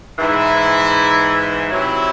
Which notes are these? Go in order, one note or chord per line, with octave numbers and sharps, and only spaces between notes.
G#2 E3 E4
C3 F#3 E4